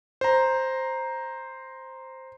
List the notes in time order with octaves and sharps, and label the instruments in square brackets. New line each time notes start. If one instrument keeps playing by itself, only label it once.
[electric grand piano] C5 A#5